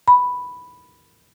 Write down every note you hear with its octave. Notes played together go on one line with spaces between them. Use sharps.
B5